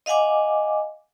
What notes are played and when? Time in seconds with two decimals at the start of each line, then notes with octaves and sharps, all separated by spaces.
0.06 D#5 F5 F#5 G#5 D6